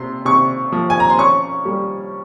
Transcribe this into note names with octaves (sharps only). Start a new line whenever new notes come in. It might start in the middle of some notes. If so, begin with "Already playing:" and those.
Already playing: C3 C6
C3 C#6
F3
G#5
A#5
C6
C#4 C#6
G3